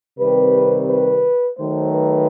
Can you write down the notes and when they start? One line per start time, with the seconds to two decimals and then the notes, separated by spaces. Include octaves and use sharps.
0.19 C3 D#3 G3 C4 B4
0.88 B4
1.59 D#3 F#3 A3 C5
1.92 B4